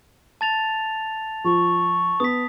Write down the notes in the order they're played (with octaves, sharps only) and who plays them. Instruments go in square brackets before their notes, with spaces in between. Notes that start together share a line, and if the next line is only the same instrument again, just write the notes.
[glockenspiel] A5 A6 F7
[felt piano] F3 [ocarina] C#6
[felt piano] B3 [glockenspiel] D#6 B6